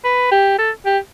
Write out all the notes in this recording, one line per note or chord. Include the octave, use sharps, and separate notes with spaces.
B4
G4
A4
G4